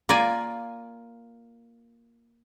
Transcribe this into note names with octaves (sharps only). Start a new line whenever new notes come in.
A#3 F4 D5 G#5